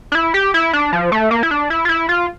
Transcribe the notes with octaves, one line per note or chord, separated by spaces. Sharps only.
D4
E4
G4
E4
D4
F3
A3
A#3
E4
D4
E4
F4
E4
F4